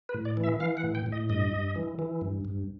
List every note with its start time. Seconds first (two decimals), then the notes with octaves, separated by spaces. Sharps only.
0.09 B4
0.14 A2
0.25 D5
0.37 E3
0.44 E5
0.60 E3 F5
0.77 F#5
0.83 A2
0.95 G5
1.06 A2
1.12 D#5
1.29 G2 D#5
1.52 G2
1.76 E3
1.99 E3
2.21 G2
2.45 G2